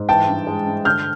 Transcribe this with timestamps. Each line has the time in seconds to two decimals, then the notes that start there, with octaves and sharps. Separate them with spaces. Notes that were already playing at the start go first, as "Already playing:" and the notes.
Already playing: G#2
0.08 E3 G5 A5
0.28 G2
0.47 G#3
0.67 G2
0.85 D3 F6 G6